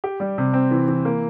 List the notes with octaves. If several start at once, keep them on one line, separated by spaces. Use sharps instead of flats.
G4
G3
C3
C4
E3
E3
A#3